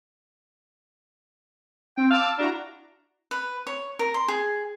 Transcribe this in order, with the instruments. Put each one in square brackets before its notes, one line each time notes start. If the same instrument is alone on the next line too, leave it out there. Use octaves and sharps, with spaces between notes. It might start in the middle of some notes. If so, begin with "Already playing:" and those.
[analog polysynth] C4 [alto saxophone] G5
[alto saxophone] F5 [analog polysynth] A5 D6 E6
[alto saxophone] D4 [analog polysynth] E4 F#4 A#5
[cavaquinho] B4
C#5
A#4
C6
G#4